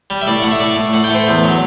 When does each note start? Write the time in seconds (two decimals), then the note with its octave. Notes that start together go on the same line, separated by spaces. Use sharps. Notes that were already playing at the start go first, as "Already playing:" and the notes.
0.10 G3
0.21 E5
0.27 A2 D5
0.42 A2 F#5
0.51 E5
0.60 A2 D5
0.76 A2
0.93 A2 F#5
1.04 G5
1.10 A3 C5
1.27 E2
1.43 F#3